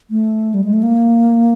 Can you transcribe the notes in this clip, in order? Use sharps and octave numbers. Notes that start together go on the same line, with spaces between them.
A3
G3
G#3
A3
A#3